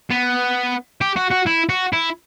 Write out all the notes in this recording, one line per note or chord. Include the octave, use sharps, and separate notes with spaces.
B3
G4
F#4
F#4
E4
F#4
E4